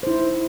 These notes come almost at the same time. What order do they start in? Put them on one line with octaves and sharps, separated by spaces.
C5 E4 D#4